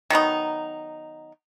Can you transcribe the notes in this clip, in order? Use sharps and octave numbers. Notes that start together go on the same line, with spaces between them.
D#3 F#3 B3 D#4